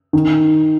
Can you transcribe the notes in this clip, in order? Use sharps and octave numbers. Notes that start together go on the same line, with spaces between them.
D#3